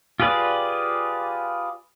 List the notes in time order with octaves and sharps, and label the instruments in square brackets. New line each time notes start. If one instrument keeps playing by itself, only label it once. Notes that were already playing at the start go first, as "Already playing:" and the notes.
[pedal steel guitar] F4 G4 G#4 B4 D5